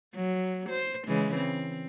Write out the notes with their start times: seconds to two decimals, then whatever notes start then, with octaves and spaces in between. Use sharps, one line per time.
0.15 F#3
0.69 C5
1.07 C#3 E3 G#3
1.35 C4